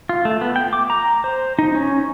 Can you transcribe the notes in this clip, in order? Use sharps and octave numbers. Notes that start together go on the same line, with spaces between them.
F4
A3
B3
G5
D6
A#5
C5
D#4
C#4